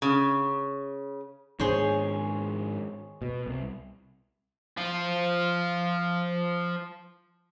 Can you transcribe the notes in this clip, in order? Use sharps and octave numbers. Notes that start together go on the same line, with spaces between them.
C#3
G#2 D#3 D4 G#4 C5 C#5
B2
C2
F3 F4